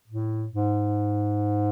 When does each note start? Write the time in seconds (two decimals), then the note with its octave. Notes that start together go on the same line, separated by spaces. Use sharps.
0.08 A2
0.53 G#2